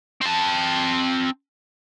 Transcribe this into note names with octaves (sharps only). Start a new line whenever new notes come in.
C4 A5